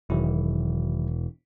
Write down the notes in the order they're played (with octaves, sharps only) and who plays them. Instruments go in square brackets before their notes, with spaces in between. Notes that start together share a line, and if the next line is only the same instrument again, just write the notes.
[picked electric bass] E1 [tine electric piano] D#3 F#3 E4